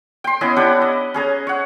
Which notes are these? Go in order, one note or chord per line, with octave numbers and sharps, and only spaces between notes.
G5 C6
B3 C#4 E4 D#5
D4 E4 G4 F#5
D#5
C#4 G#4 A#5
C#5 F#5